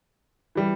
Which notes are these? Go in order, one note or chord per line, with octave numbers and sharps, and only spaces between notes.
E3 G3